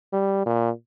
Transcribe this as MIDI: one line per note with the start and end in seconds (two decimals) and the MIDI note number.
0.13 0.44 55
0.46 0.70 46